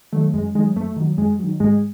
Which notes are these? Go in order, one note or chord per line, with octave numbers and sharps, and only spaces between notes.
D#3 F#3 A3
F#2 G#3
D#3 F#3 G#3
F#2 A3
D#3 F#3
F#2 G#3
D#3 F#3
G#2 G#3